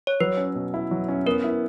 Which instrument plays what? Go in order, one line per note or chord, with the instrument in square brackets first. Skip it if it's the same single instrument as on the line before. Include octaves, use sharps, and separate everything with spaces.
[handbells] C#5
[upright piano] F#3 [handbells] B4
[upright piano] C#4
B2
E4
F#3
C#4
[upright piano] B3 [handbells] A#4
[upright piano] E4